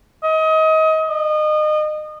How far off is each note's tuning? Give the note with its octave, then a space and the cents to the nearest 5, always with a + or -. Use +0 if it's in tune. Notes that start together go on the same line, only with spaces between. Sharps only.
D#5 +30
D#5 -30